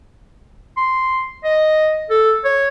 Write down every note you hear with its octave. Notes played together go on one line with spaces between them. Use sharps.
C6
D#5
A4
C#5